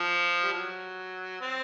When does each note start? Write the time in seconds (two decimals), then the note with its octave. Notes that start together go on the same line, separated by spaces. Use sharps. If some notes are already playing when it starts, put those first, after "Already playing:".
Already playing: F3
0.43 G3
0.53 F#3
1.41 C4